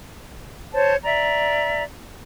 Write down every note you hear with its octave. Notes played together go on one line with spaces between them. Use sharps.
C5 C#5 A5
D5 E5 A#5